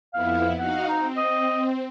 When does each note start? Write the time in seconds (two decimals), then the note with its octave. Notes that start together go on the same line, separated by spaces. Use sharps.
0.14 F2 B3 E4 F5
0.58 D#4 F#4 F5 F#5
0.88 C4 D#4
1.17 D#5